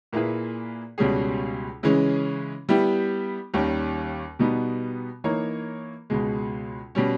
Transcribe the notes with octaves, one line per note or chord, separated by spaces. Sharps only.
A#2 A#3 E4 G#4 B4
C#2 B2 G3 C#4 G#4
C#3 E3 G#3 C#4
G3 B3 E4 G4
D#2 D#3 G3 C#4
B2 G3 B3 D#4
E3 A#3 D#4 A#4 C#5
C#2 B2 G#3
B2 G3 C#4